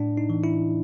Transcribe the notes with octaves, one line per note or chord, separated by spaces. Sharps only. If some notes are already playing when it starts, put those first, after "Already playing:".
Already playing: A2 D4
D#4
E3
E4